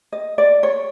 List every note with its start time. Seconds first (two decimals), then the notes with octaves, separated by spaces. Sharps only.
0.12 D#5
0.38 D5
0.63 C#5